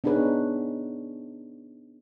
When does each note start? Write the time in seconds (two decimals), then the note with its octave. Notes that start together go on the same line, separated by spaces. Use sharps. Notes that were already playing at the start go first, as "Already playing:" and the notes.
0.04 B3 D4 D#4 G#4 B4 C#5